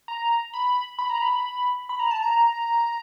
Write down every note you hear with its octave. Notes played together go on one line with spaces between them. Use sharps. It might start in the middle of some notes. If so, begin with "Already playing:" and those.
A#5
B5
B5
A#5
B5
B5
A#5
A5
A#5